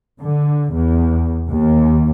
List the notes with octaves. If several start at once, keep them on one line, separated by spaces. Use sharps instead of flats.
D3
E2
D#2